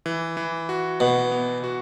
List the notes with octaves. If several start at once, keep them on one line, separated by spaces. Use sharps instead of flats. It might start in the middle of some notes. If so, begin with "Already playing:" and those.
E3
E3
F#4
B2 B3
B3
F#4